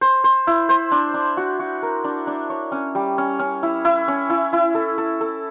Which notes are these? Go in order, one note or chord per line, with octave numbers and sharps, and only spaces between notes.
C5
C5
E4
C5
D4
D4
F#4
F#4
A#4
D4
D4
C#5
C#4
G3
C#4
C#4
E4
E4
C#4
E4
E4
A4
A4
A4